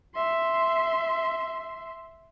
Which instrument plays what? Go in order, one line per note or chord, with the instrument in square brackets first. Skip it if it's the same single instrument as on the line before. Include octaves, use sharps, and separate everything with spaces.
[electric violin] E5 C6